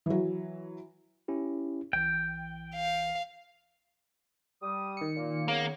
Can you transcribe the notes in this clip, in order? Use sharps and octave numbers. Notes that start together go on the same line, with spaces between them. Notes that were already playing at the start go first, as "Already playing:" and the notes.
E3 F#3
C#4 E4 G4
B1 E3 G5
F5
G3 D#6
D#3 C#7
A#2 A#3
C#3 A#3 B3 C#5